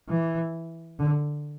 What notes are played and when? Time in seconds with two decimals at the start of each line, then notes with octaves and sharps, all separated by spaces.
0.10 E3
0.99 D3